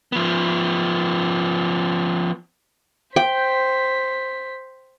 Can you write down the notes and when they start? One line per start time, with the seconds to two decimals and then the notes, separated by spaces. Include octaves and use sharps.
0.12 F3 B3
3.16 C5 G5 B6